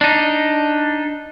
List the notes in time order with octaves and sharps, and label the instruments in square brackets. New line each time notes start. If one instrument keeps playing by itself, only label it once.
[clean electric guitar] D4 D#4